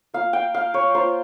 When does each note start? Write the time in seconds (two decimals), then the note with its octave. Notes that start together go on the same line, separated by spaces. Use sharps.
0.14 A#3 F4 F5
0.33 G5
0.54 F5
0.74 C#5
0.95 A#3 F4 C5